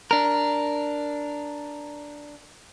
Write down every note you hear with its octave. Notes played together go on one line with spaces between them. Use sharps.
D4 A#4